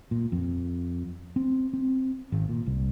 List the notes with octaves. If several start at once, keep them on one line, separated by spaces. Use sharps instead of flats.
A#2
F2
C4
C4
G#1
A#2
C2